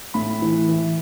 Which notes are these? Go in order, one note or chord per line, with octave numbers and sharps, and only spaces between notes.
A2 B5
E3
E3